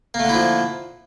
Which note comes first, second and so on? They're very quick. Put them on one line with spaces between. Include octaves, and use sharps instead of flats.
A#3 A3 D3 E4 F3